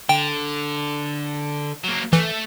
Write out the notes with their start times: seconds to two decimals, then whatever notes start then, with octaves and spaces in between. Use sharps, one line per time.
0.09 D3 G5
1.84 F#3 A#3
2.13 E3 A3